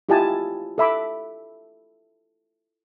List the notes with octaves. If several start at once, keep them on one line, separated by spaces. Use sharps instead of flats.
E4 F4 G4 D#5 G#5 A5
A4 E5 B5 D6